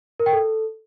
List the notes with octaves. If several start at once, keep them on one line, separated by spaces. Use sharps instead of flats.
A#4
G5
A4